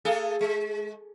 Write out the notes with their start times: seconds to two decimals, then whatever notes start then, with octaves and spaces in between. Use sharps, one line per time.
0.05 A3 G#4 A4
0.41 G#3